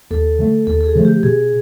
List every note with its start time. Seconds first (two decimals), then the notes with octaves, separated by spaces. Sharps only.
0.10 D#2 A4
0.39 D3 F3 A3
0.67 D#2 A4
0.81 A4
0.86 G#4
0.95 D3 F3 A3
1.05 G4
1.23 B2 G#4